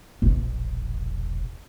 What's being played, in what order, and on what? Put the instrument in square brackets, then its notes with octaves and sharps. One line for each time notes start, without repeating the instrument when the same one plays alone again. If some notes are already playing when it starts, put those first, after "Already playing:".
[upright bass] E1 A#1